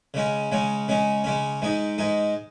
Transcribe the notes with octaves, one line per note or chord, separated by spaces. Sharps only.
C#3 G#3 C#4
C#3 G#3 C#4
C#3 G#3 C#4
C#3 G#3 C#4
G#2 G#3 D#4
G#2 G#3 D#4